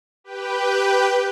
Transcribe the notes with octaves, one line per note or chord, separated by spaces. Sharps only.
G4 B4 G5